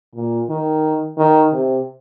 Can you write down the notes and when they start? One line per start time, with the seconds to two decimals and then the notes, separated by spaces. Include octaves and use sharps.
0.15 A#2
0.49 D#3
1.18 D#3
1.53 C3